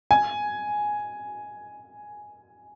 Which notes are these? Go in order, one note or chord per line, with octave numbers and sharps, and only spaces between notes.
G#5